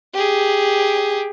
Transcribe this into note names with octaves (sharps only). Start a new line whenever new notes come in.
G4 G#4